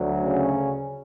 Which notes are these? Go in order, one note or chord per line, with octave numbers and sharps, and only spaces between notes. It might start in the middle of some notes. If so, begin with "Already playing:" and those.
Already playing: D2 F#3
C#3 C#4